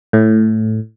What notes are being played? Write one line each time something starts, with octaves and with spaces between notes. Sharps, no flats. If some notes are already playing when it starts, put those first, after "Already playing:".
A2